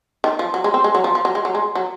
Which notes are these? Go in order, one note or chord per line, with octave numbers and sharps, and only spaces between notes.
D#3
F3
F#3
G#3
C4
G#3
F#3
F3
F3
F#3
G#3
F#3
G#3
F#3